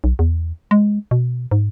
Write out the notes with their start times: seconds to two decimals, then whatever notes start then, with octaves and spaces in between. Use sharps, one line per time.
0.04 B1
0.19 E2
0.71 G#3
1.11 B2
1.51 G#2